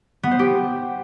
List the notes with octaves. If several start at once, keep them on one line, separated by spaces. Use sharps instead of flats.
B3
C5
G4